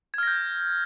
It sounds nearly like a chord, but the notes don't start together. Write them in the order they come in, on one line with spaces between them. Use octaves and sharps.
G#6 F6 A#6 G6